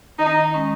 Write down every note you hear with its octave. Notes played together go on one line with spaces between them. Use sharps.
D#3 D#4
G#3 C#4